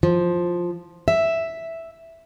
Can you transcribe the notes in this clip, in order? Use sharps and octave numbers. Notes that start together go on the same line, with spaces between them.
F3
E5